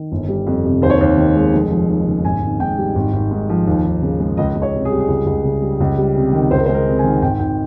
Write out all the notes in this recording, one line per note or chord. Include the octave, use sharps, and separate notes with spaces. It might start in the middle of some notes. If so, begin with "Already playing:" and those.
Already playing: D#3
G1
G3
F2
C3
D#2 C5
C#5
D#2 C5
D#3
G#3
F1
F3
D#2
C#3
G#1 G#5
G#1
G#2 G5
G3
G#1
G#1
G#2
F3
D#2
D#2
C#3
G#3
C#2 D#5
C#2
C#5
C3
G#4
G3 G4
G#4
C#2
C#2
C#3
G3
C#2
G3
C3
D#3
C#2 C5
A#4
C5
G#3
A#4
C3
G#5
D#3
G#1 G5
G#1 G5